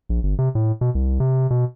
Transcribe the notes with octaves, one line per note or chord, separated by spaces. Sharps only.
A#1
G1
C3
A2
B2
C2
C3
B2